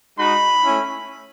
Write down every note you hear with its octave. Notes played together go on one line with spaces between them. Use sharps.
G#3 D#4 F#4 B5
A3 C#4 E4